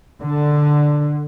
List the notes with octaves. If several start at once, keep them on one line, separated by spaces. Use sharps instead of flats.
D3